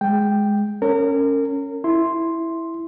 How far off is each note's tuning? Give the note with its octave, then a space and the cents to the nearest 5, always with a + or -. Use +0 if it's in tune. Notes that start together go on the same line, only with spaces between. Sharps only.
G#3 +0 G5 +0
C#4 +0 A#4 -30
E4 +0 C6 +0